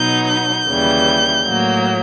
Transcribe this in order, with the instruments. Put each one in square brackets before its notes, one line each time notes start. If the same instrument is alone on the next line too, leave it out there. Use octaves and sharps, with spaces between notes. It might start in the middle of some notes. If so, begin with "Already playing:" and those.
Already playing: [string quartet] B2 F#3 B3 D#4 [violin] G6
[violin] G6
[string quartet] D#2 C#3 E3 G3
A2 F#3 A#3